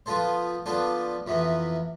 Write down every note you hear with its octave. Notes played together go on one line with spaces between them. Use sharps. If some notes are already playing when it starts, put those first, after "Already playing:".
F3 B3 F4 A4 C5
F3 B3 D4 A4 C5
F2 C3 E3 B3